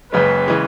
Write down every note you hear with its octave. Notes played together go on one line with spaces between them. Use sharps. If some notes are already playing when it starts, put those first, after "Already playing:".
F#1 F#2 C#3 G#3 B4
C#3 E3 G#3